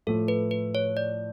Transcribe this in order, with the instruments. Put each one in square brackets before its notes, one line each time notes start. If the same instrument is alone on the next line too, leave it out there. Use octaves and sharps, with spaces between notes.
[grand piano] A2 F3 A3 [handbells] A4
[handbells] B4
B4
C#5
D5